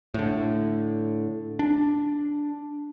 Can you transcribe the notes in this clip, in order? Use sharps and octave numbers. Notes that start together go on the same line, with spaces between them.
A2 D3
D4